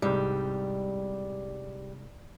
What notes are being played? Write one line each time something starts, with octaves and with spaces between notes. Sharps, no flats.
C2 G#2 G3